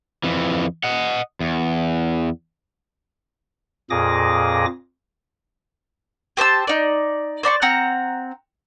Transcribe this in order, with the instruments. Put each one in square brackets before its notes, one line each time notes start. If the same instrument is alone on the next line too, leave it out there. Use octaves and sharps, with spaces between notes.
[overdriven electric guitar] F2 E3
D#5 F#5
E2
[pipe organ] F2 A#2 G#4 D6 D#6 A#6
[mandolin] G4 C5 A5 E6
D#4 D5
C5 D5 B5 C#6
C4 F#5 A#5 F6